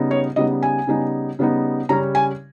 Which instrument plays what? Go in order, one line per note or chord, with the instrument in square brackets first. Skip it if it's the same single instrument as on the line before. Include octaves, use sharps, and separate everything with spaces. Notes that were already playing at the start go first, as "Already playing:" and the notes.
Already playing: [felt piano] C#3 G3 B3 D#4
C#5
C#3 G3 B3 D#4 D#5
G#5
C#3 G3 B3 D#4
C#3 G3 B3 D#4
C#3 G3 C#4 A#5
G#5